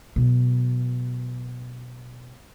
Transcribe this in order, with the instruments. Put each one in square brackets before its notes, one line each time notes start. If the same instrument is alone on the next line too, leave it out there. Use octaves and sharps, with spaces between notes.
[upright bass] B2 F#3